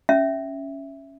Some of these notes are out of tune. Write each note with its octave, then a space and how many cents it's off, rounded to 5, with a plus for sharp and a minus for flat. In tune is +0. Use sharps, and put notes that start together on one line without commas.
C#4 +0 E5 +0